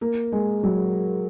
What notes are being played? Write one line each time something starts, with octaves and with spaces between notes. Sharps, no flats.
A#3
G#3
F#3